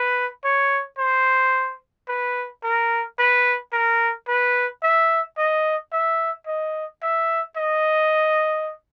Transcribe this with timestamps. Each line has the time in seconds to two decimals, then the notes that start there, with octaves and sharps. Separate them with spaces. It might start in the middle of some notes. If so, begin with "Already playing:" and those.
Already playing: B4
0.44 C#5
0.98 C5
2.08 B4
2.64 A#4
3.19 B4
3.73 A#4
4.28 B4
4.83 E5
5.38 D#5
5.93 E5
6.47 D#5
7.03 E5
7.57 D#5